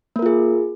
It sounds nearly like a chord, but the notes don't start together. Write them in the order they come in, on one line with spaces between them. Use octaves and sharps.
A#3 A#4 F4 G#4